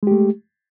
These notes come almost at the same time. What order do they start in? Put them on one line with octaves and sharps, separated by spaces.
G#3 G4 A3